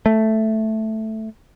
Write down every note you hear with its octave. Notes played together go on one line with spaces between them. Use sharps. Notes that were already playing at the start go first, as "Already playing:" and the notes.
A3